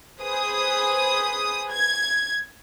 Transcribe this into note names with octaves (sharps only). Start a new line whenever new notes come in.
G#4 B4 C5 D#6
G#6